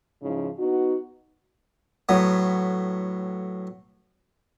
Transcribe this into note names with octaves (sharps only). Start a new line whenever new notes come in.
G#2 C#3 F3 D#4 E4
B3 D#4 F#4
A2 F#3 B3